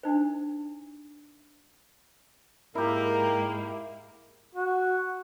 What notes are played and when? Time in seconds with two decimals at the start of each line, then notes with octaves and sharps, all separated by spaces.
0.03 D4 D#4 C5
2.75 G#2 A#3 E4 G4 A#4
4.55 F#4